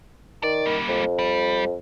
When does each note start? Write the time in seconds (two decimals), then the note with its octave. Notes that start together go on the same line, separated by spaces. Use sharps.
0.43 D#3 D5
0.66 G3 A#3
0.88 F2
1.19 G3